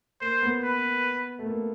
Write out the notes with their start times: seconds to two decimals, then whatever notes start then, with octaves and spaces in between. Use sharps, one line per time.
0.21 A#3 C5
0.42 B3
0.63 B4
1.39 A3
1.46 A#3